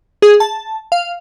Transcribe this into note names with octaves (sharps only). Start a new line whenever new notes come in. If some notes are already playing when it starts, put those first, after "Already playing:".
G#4
A5
F5